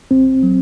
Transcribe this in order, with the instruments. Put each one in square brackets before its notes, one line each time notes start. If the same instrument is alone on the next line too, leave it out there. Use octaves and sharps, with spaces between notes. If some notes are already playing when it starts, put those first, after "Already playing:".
[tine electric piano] A1 [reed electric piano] C4
[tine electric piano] F#3